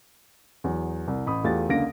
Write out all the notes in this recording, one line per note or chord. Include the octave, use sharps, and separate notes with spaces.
E2 F#3
C2
A1 B5 D#6
E2 A3 F4 G4 A6
C#2 D3 A#3 A#6 D7